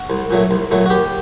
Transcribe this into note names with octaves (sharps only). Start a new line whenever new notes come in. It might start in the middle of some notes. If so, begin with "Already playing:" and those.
Already playing: F#4
C2
A#2 F#3 A3
C2
A#2 F#3 A3
F#4
D#2 G4